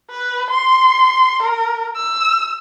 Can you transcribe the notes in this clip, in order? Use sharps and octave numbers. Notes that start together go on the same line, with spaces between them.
B4
C6
A#4
E6